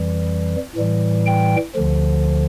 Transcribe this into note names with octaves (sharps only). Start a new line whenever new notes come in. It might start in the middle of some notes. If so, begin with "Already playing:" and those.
Already playing: F2 E3 G3
A2 E3 G3
G5
D2 D3 F3